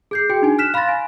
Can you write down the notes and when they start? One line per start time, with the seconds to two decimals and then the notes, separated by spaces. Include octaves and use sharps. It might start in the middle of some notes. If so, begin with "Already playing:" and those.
0.11 G#4 G6 C7
0.29 F#4 G#4 G5
0.42 D4 D#4 G#5
0.58 F6 F#6 B6 E7
0.74 F5 B5 C6 F#6 A6 A#6
0.88 G#5